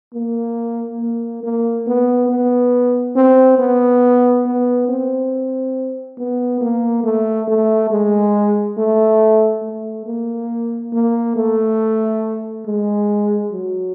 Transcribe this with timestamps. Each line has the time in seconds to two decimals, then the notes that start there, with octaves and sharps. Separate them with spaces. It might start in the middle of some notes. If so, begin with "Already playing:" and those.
0.14 A#3
1.00 A#3
1.43 A#3
1.87 B3
2.29 B3
3.16 C4
3.59 B3
4.46 B3
4.89 C4
6.18 B3
6.61 A#3
7.04 A3
7.48 A3
7.91 G#3
8.77 A3
9.63 A3
10.06 A#3
10.93 A#3
11.36 A3
12.66 G#3
13.51 F#3